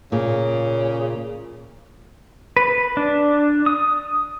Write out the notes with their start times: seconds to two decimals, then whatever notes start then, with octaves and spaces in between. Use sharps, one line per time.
0.12 A#2 C#3
2.57 B4
2.97 D4
3.66 D#6